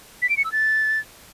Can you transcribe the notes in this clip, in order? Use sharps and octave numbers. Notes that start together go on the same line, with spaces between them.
B6
D7
C#7
E6
A6